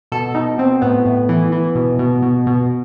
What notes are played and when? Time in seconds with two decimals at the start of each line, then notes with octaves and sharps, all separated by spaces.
0.12 B2 A4
0.34 B2 D#4
0.58 B2 C4
0.82 A2 B3
1.05 A2
1.29 E3
1.52 E3
1.75 B2
1.99 B2
2.22 B2
2.47 B2